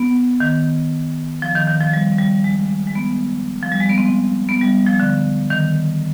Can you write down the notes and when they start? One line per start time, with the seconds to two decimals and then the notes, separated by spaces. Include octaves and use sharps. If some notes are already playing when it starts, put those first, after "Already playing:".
Already playing: B3
0.40 D#3
1.42 F3
1.55 D#3
1.67 D#3
1.80 F3
1.93 G3
2.18 G3
2.44 G#3
2.87 G#3
2.95 B3
3.63 F3
3.72 G3
3.80 G#3
3.89 B3
3.98 C4
4.49 B3
4.61 G3
4.87 F3
5.00 D3
5.50 D#3